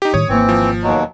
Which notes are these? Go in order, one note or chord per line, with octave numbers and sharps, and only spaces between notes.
D#4 G4
A2 D#3 G3 C#5 D#6
G#1 E3 A#3 C4
F3
D#2 B2 F#3